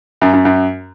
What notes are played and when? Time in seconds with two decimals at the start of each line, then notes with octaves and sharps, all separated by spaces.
0.22 F#2
0.33 F#2
0.45 F#2